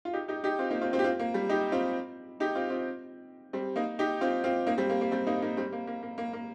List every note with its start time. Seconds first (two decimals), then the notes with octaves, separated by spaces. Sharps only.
0.05 F4
0.13 D#4 G4
0.28 D#4 G4
0.44 D#4 G4
0.59 C4 F4
0.70 A#3 D#4
0.82 C4 F4
0.93 C4 F4
0.99 G4
1.04 C4 F4
1.19 A#3
1.34 G3
1.49 D#4 G4
1.72 C4 F4
2.40 D#4 G4
2.55 C4 F4
2.70 C4 F4
3.53 G3 C4
3.76 A#3 D#4
3.99 D#4 G4
4.21 C4 F4
4.44 C4 F4
4.67 A#3 D#4
4.78 G3 C4
4.90 A#3
5.01 A#3
5.12 G3 C4
5.27 A#3 D#4
5.42 A#3 D#4
5.57 G3 C4
5.73 A#3
5.87 A#3
6.03 A#3
6.18 A#3
6.33 A#3